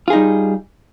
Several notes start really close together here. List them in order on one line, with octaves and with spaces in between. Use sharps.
F4 G#4 D#4 G3